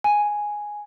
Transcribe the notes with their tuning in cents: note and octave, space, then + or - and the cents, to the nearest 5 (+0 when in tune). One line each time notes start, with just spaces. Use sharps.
G#5 +0